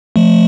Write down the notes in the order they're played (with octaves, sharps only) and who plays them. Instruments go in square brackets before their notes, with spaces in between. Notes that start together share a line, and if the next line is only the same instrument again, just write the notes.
[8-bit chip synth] F3 A3